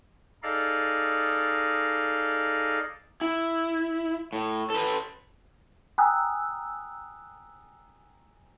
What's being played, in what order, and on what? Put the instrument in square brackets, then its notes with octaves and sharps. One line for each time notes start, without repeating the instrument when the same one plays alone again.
[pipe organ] D#4 G#4 A4 D5 D#5 F5
[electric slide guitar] E4
A2
A4 B4
[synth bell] G5 G#5 A#5 D#6 E6 F#6